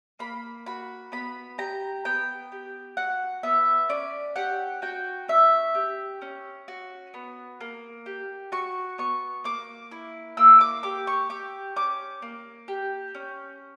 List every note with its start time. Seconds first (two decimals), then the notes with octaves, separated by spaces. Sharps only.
0.19 A#3 B5
0.66 F#4 B5
1.12 B3 B5
1.58 G4 A#5
2.05 B3 G5
2.52 G4
2.97 F#4 F#5
3.43 B3 E5
3.89 C#4 D5
4.36 G4 F#5
4.82 F#4 G5
5.28 C#4 E5
5.75 G4
6.22 C#4
6.68 F#4
7.14 B3
7.60 A#3
8.06 G4
8.52 F#4 C#6
8.98 B3 C#6
9.44 A#3 D6
9.91 E4
10.37 A#3 E6
10.61 D6
10.83 G4 D6
11.07 C#6
11.30 G4 D6
11.76 C#4 D6
12.22 A#3
12.68 G4
13.15 C#4